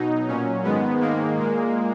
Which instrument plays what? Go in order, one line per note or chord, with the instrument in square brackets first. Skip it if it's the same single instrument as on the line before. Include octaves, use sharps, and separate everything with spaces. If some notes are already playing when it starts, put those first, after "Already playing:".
Already playing: [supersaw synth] B2 F#3 D#4
A#2 F#3 C#4
G#2 D#3 G#3 B3
G#2 D#3 G#3 A#3
A#2 G#3